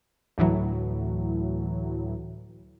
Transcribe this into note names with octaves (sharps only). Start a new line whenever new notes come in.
D2 A2 E3 F#3